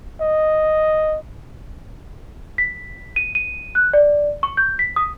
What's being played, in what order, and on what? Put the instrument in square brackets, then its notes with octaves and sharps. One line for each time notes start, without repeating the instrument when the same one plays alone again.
[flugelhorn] D#5
[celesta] B6
D#7
D#7
F#6
D5
C#6
G6
B6
D#6